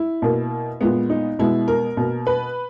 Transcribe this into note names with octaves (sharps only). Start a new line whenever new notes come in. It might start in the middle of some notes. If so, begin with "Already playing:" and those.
Already playing: E4
B2 A#3
A#2 G#3 B3
D#4
B2 G#3 B3 E4
A#4
B2 A#3
B4